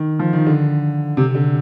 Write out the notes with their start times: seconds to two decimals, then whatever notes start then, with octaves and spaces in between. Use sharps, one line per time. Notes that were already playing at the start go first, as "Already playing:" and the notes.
Already playing: D#3
0.19 F3
0.33 D#3
0.46 D3
1.17 C3
1.35 D3